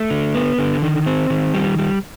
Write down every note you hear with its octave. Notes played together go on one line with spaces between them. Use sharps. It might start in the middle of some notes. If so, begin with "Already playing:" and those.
Already playing: A3
D3
B3
D3
D#3
C4
D#3
G3
G3